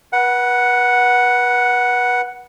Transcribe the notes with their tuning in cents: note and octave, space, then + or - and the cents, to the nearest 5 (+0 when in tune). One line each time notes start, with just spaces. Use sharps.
B4 -30 F#5 +0